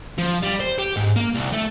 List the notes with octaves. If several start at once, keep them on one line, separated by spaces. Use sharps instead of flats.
F3
G3
C5
G4
G#2
A#3
C2
A3